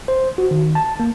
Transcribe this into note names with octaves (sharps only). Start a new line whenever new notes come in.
C5
F#4
D#3
A5
A#3